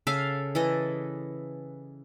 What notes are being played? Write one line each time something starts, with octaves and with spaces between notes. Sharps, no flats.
C#3 A4 E5 F5
E3 A4 D#5